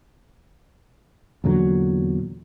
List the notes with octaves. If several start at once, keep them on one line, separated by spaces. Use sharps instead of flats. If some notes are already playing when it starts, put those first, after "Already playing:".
E2 A#2 D3 F#3